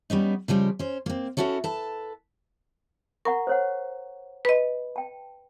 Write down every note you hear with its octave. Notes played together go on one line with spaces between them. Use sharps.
G3 B3 C#4 D#4
C#3 F3 G3 G#3
C#4 C5
A#3 C4
C#4 E4 F#4 A4 C#5
A4 B4 A5
A#4 F#5 A#5 C#6
C5 C#5 F#5
B4 D#5 B5
G5 A5